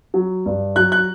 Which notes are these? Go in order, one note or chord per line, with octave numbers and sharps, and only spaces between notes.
F#3
G2
F#3 F#6
F#6